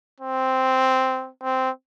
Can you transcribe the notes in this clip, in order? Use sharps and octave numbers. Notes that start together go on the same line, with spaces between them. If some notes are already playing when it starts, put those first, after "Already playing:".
C4
C4